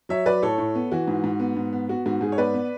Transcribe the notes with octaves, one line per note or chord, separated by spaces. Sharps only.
F#3 C#5 E5
F#3 B4 D5
A2 A4 C#5
A2
B3
E3 F#4
G#2
G#2
B3
G#2
B3
B3 F#4
G#2 F#4
G#2 G#4
C#5
B3 B4 D5
B3